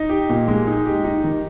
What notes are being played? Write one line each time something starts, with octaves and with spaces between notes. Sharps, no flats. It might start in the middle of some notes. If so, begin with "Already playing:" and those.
Already playing: D#4
G4
A#2
G#3
D#4
G4
D#4
D#3